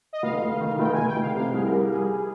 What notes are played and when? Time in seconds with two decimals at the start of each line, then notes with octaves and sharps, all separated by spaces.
0.13 D#5
0.23 F1 F5
0.42 F1
0.61 D#3
0.79 F1 G5
0.93 F1 G#5
1.07 G5
1.17 F1 F5
1.35 C3 F5
1.54 C2 G#4
1.63 A#4
1.72 G3
1.91 G3 G#4